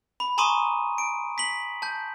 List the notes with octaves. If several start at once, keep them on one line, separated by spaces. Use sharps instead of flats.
B5
G#5 A#5 C6 C#6 D#6 D#7
D7
B6 F#7
A5 G6